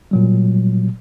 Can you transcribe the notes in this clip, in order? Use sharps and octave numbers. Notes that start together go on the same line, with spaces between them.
A#2 F#3 G3